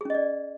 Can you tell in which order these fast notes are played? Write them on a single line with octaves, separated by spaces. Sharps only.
G#4 C#4 D#5 D5